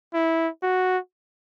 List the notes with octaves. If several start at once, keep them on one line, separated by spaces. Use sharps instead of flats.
E4
F#4